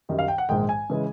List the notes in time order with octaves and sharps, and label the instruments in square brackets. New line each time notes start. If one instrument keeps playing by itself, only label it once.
[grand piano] F#2 D#3 G3
F5
G5
F#5
A#1 G#2 D#3 G#3 G5
G#5
C#3 E3 G#3